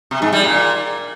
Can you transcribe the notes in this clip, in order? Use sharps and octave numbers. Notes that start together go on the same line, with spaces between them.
C3
G#2
G3
A#2